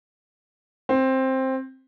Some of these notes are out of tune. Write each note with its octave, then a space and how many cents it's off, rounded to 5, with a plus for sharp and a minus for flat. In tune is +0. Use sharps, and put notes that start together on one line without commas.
C4 +10